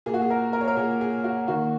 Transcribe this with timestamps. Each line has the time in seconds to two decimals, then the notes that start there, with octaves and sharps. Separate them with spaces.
0.06 A#2 A#3 G#4
0.14 F#4
0.22 G#4
0.30 A#4
0.53 A#4
0.61 C#5
0.68 A#4
0.77 A#2 A#3 G#4
1.01 G#4
1.24 F#4
1.48 D#3 A#3 F#4